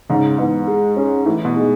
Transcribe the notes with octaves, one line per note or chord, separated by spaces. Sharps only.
G#2 C#3
G#2 E3 B3
G#3
C#4 G#4
A2 E3
B2
G#3 D#4 G#4